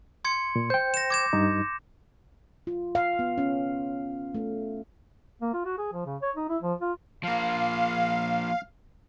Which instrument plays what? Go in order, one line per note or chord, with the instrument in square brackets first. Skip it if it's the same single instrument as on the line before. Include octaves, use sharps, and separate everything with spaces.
[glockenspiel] C6 G#6 C#7
[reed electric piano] A#2
[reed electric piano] C5 G5 [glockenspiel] G6
[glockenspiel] A#6 E7
D6 G#6 E7
[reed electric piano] G2 D#4
[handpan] F4
F5
B3
C#4
A3
[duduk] A#3
F4
F#4
G#4
F3
C#3
C#5
D#4
E4
F3
F4
[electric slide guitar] F3 A#3 [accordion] F5